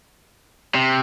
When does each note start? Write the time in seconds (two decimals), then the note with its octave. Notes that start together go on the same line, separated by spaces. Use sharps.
0.75 C3